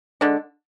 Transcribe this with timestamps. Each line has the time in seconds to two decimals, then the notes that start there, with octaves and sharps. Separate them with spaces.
0.21 D3 G#3 D4